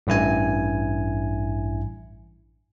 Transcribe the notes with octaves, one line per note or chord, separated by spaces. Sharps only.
A1 G2 E4 G#5